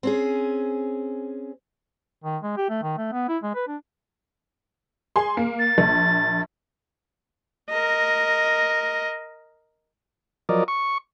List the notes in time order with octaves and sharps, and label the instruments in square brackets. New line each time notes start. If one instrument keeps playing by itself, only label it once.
[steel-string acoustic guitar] C4 C#4 G#4
[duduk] D#3
G#3
G4
A3
D#3
A3
B3
E4
G#3
B4
D4
[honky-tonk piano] G#4 G#5 C6
A#3
[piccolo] A6
[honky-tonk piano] A#1
[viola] A#4 D#5
[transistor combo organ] F3 F#3 A#4 D5 D#5
C#6